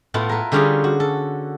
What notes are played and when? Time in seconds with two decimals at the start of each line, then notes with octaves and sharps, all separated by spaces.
0.14 A2 B3 E4 F4
0.29 A#4 B4
0.52 D3 G3 C#4 F4 G4 G#4
0.84 F#4
1.00 A4